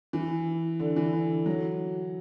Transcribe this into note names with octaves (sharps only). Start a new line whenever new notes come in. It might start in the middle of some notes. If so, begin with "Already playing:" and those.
E3
D3
E3
D3
F#3